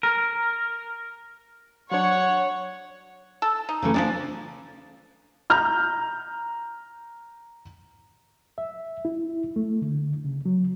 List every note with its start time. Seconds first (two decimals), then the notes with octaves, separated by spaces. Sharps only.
0.03 A#4
1.91 F#3 D4 C#5 F#5
3.42 A4
3.69 D#4
3.82 C#3 E3 A3
3.94 F3 G#3 D4 G#4 D5
5.50 A#5 F6 G6
8.58 E5
9.05 E4
9.56 A3
9.82 D3
10.24 C#3
10.46 F#3